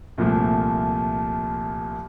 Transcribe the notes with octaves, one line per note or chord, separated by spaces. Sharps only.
C2 A#2 F3 A3